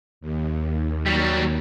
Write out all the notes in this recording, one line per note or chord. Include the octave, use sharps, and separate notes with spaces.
D#2
F#3 G3